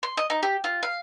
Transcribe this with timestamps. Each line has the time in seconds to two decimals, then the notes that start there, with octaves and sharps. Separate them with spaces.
0.03 C6
0.17 D#5
0.30 D#4
0.43 G4
0.64 F4
0.83 F5